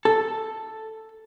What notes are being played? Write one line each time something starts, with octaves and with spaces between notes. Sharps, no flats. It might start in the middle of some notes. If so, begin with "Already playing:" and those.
A4